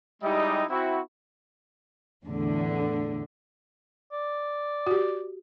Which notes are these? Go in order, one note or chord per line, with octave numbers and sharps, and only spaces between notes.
G3 G#3 D#4 E4 G4 D#5
C4 E4 F#4
E2 A2 D3
D5
F#4 G4